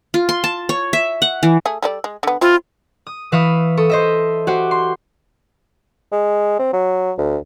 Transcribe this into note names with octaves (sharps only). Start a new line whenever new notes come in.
F4
C6
A5
C#5
E5
F#5
E3
A3 G#4
G3 A4 D5
G#3
D3 B3
C4 E4 F4
D#6
E3 B4 E5 F5 C#6 D#6
A4 C#6 D#6
C5 D#5 E5
F#4 G4 C5
C6
G#3
C4
F#3
D2